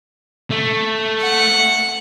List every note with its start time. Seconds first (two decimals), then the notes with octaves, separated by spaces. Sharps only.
0.50 A3
1.22 F#5